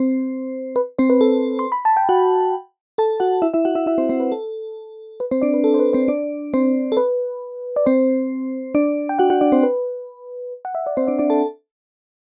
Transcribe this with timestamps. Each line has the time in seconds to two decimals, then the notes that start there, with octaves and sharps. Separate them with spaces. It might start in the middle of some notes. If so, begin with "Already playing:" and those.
Already playing: C4 C5
0.76 B4
0.99 C4 C5
1.10 B4
1.21 A4
1.59 C6
1.72 B5
1.85 A5
1.97 G5
2.09 F#4 F#5
2.98 A4 A5
3.20 F#4 F#5
3.42 E4 E5
3.53 E4 E5
3.65 F#4 F#5
3.75 E4 E5
3.86 E4 E5
3.98 C4 C5
4.09 C4 C5
4.20 B4
4.32 A4
5.20 B4
5.31 C4 C5
5.42 D4 D5
5.54 B4
5.64 A4
5.74 C5
5.79 B4
5.93 C4 C5
6.08 D4 D5
6.54 C4 C5
6.92 A4
6.97 B4
7.76 D5
7.86 C4 C5
8.75 D4 D5
9.09 G5
9.19 F#4 F#5
9.30 F#4 F#5
9.41 D4 D5
9.52 C4 C5
9.63 B4
10.65 F#5
10.75 E5
10.86 D5
10.97 C4 C5
11.07 D4 D5
11.18 D4 D5
11.30 A4 A5